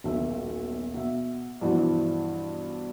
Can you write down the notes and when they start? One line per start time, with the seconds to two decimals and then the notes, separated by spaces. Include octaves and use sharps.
0.04 D#1 B1 E5
0.94 B2 E5
1.61 G2 B2 E3 F3 F#4